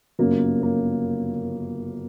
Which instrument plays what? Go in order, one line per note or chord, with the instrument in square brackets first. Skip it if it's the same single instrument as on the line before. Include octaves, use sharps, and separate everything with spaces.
[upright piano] G1 F#2 C#3 A#3
A#3